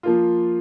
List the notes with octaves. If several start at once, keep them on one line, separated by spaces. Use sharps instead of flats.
F3 A#3 F4